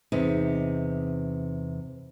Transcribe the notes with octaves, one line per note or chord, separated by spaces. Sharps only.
E2 C3 D#4